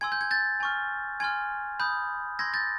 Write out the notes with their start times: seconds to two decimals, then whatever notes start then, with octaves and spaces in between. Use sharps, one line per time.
0.01 G#5 C6 E6 G#6
0.12 G6
0.21 G#6
0.31 G6 A6
0.60 G#5 C#6 F6
1.20 G#5 C6 F6 G#6
1.80 B5 D#6 F#6 G6
2.39 C6 E6 G6 G#6 A#6
2.54 G6 A6